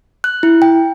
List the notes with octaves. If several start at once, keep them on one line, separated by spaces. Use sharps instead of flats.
F#6
E4
G5